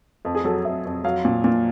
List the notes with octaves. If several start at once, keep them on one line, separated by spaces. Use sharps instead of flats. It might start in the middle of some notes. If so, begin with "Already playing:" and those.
F2
G#4
F#3 A4
F2 E5
F2
F#3 F5
A#2
A#2